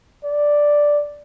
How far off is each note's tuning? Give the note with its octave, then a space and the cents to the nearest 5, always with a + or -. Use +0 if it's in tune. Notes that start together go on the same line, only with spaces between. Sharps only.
D5 +0